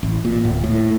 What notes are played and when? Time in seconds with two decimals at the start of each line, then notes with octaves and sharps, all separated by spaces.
0.03 A1
0.25 A#2
0.45 D1
0.64 A2